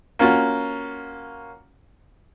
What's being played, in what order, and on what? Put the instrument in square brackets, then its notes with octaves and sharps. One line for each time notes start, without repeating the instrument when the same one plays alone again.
[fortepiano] A#3 C#4 F4 F#4